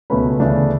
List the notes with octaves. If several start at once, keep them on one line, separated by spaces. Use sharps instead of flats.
C#2 B2 A3 C#4 B4 B5
D2 C#3 E3 A3 D4